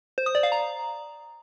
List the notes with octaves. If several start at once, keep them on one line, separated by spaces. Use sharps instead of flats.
C5
D#6
D5
F5
A#5